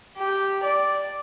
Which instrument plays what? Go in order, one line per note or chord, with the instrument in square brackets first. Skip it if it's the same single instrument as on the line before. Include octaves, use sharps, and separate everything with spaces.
[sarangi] G4
D5